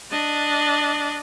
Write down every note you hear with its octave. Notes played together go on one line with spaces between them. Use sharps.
D4 D#5